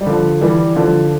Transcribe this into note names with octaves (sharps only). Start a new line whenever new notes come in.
G3
D3 F3
E3 G3
D3 F3